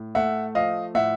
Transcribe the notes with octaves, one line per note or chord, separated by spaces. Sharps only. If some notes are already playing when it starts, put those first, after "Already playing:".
Already playing: A2
A3 E5 F#5
F3 D#5 F5
A2 E5 F#5